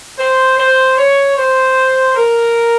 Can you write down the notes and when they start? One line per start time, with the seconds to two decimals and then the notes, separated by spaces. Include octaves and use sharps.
0.18 C5
0.57 C5
0.97 C#5
1.37 C5
2.15 A#4